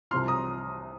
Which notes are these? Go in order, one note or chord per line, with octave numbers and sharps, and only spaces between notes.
C2 C3 F3 C6 F6
A#5 D#6